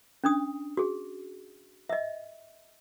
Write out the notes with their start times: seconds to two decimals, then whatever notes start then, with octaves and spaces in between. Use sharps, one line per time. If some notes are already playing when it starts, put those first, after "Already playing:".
0.24 C#4 D4 D#6
0.77 F#4 G#4
1.89 D#5 E5